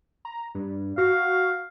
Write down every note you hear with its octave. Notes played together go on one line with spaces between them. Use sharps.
A#5
G2
F#4 F5